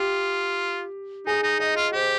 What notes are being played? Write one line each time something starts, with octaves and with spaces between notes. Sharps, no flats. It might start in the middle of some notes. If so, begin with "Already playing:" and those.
Already playing: F4 G4
D#4 G#4
D#4
D#4 D#5
F4
G4 C5